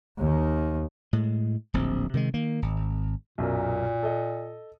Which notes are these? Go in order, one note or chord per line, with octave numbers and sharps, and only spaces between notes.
D#2 D#3
A2 G#3
D1 A#1 C4
C3 D#3 F3 G#3
D#3 A#3
G#1
B1 F#2 A#2 A#4
A4 D#5